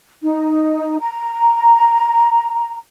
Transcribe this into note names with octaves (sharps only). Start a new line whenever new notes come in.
D#4
A#5